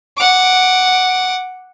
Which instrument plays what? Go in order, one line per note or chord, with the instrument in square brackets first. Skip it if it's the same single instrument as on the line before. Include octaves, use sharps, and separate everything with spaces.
[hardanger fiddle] F#5 D6